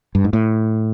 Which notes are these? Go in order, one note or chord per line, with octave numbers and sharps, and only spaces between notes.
G2
G#2
A2